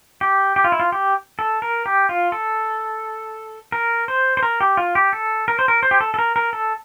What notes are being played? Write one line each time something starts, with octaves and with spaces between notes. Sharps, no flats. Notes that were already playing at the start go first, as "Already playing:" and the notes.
G4
G4
F4
E4
F4
G4
A4
A#4
G4
F4
A4
A#4
C5
C5
A#4
G4
F4
G4
A4
A#4
C5
A#4
C5
G4
A4
A4
A#4
A#4
A4